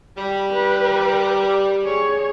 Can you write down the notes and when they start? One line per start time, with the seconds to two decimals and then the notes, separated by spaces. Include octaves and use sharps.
0.17 G3 B5
0.51 B4
1.83 G#4 C#5